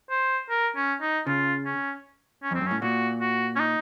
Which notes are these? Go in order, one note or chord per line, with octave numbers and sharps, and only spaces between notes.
C5
A#4
C#4
D#4
C#3 F4
C#4
C#4
F2 C4
F#2
A2 C#4
A#2 F#4
F#4
C#4
D#4